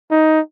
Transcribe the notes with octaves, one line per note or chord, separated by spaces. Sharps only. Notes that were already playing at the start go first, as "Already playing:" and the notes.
D#4